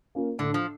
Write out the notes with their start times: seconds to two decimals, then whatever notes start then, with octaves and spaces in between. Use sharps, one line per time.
0.15 A#3 C#4 F4 A#4
0.38 A2 D3
0.54 F3